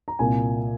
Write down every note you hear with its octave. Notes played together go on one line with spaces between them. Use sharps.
A#5
C2 A#2 G#5